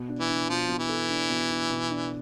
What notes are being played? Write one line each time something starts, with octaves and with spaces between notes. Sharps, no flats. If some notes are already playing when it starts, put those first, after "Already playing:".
Already playing: B2
D4
E3
D4
B2 F3
B2
E3
A4
D4
B2
D4
B2
D4